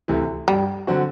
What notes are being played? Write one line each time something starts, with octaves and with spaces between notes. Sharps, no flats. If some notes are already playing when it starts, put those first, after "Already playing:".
D2 C3 E3
G2 G3
D3 F#3 C4 F#4